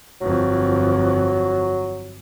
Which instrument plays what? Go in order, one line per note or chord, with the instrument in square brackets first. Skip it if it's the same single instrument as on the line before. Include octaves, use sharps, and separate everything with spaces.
[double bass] G1 F2 [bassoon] F#3